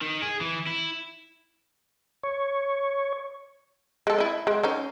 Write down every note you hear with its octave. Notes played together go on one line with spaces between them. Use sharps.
D#3
G#4
E3
E4
C#5
G#3 A4
E4 D#5
G#3
C#4 D#4 C5